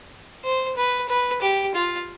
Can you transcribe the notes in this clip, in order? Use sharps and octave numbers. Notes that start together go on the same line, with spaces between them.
C5
B4
B4
G4
F4